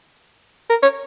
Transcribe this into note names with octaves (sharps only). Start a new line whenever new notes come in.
A#4
C#5